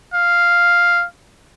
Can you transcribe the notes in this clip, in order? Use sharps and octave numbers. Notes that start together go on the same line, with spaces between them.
F5